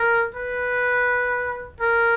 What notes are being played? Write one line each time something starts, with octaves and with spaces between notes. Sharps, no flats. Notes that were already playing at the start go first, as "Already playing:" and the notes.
Already playing: A#4
B4
A#4